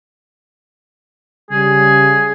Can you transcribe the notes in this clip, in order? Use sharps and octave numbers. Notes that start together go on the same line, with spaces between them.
C#3 G3 G#4